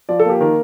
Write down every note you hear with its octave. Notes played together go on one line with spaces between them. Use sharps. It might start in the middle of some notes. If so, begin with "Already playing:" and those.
F3 D5
A4
A#3 G4
D#3 A#4